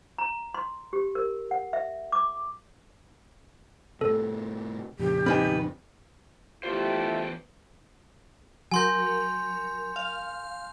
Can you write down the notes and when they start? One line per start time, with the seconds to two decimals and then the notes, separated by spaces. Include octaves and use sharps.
0.18 A#5
0.54 C6
0.93 G4
1.15 A#4
1.51 F#5
1.73 E5
2.12 D6
4.01 A2 C3 A4
4.99 F2 A#2 C#3 G4
5.26 D#3 C4 B4 G#5
6.63 E2 A3 D4 E4 F4 G4 C5
8.71 F#3 A#4 G#5 C6 G6
9.96 F5